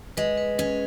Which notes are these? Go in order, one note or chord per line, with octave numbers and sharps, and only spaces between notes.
G#3 B4
B4
C#4 B4